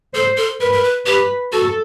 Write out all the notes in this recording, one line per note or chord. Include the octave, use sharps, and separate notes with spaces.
A4 C5
A4
A#4 B4
A#4
B4
G4 B4
F#4 A4